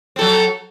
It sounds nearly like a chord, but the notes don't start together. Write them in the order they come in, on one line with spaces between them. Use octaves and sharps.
C4 A4 F#3